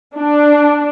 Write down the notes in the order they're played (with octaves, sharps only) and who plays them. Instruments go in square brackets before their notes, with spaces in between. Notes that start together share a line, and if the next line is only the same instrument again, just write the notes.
[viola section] D4